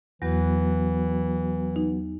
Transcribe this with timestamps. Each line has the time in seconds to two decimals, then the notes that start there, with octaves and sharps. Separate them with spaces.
0.22 E2 E3 F#3 B3 F#4
1.76 D#4